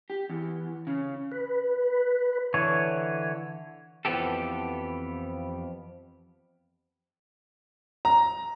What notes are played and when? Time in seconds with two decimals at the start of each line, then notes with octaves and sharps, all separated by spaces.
0.10 G4
0.29 E2
0.87 C#3
1.32 B4
2.54 D3 E3 C#5
4.05 F2 E3 F3 B3 G4 A4
8.05 A#5